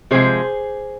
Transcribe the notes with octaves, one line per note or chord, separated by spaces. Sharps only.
C3 F3 G#3 G#4 C5